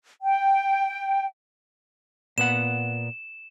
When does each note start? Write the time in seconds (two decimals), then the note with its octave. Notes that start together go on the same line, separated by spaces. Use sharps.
0.22 G5
2.38 A#2 B3 F#5 E7